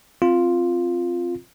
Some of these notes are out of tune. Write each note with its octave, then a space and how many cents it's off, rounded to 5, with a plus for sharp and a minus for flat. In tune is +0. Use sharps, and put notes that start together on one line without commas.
C4 +0 F4 +0